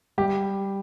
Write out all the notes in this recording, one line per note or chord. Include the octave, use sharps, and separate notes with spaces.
G3 G4